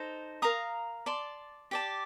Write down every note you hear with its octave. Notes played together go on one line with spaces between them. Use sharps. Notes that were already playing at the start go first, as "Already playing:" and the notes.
Already playing: D#4 A4 C5
A#4 F5 A#5 D#6
D5 A5 C6
G4 D5 A5